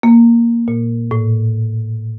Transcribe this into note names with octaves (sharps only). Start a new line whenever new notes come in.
A#3
A#2
A2